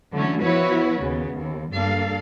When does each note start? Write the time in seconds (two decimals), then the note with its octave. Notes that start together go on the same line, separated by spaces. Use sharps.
0.14 D3 E3 F#3 A3 C#4
0.42 F3 B3 E4 F#4 B4 C#5
1.00 D#2 C#3 B3
1.35 D#2
1.73 G2 A#3 D4 A4 F5